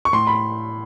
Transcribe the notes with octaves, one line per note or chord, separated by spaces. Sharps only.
C#6
A2 C6
B5